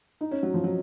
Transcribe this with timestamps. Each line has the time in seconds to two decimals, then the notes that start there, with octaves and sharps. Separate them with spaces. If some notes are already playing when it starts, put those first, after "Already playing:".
0.21 D#4
0.31 C#4
0.43 F#3
0.54 F3
0.64 F#3